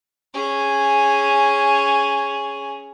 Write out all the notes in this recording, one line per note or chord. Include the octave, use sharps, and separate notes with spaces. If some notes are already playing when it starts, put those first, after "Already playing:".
C#4 G#4